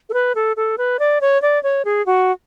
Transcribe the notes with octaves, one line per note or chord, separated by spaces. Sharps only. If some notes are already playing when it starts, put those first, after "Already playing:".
A4
B4
A4
A4
B4
D5
C#5
D5
C#5
G#4
F#4